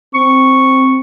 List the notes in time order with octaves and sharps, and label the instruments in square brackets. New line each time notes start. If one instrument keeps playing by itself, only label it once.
[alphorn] C4 [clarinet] C#6